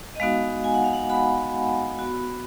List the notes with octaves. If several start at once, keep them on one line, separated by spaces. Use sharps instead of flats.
D#5
G#3 B3 D#4 F#4 F5
G#5
F#5
F5
F#5
G#3 B3 D#4 F#4 B5
B3 F#4